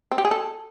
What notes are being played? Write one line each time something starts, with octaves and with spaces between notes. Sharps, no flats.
C4
G4
G#4
A4